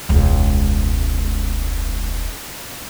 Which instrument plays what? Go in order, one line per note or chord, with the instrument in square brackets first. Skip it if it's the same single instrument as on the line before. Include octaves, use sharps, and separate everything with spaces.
[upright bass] E1 C#2